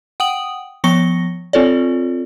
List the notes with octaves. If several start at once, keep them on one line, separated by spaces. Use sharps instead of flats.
F#5 G5 D#6 F#7
F3 B3 C#6 A#6 C#7 G7
C4 F4 A4 C#5 D5